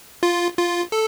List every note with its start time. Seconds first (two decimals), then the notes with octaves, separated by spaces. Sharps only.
0.23 F4
0.57 F4
0.92 A4